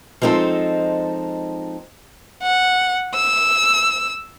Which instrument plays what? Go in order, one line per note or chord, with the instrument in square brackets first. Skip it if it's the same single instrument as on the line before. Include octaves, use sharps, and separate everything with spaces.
[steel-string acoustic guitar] F3 G#3 C4 D#4 A4
[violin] F#5
E6